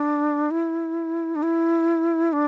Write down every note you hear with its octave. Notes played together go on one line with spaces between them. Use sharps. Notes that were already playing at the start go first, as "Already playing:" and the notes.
Already playing: D4
E4
D4
E4
D4